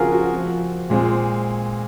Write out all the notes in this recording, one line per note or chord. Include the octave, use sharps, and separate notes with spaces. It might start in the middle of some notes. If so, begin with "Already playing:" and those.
Already playing: C#3 F3 C4 F4 F#4 G#4 A#4
F#4
F3 C4
A#2 G#3 C4